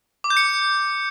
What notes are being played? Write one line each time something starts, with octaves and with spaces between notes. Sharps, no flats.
D6
G6
C#7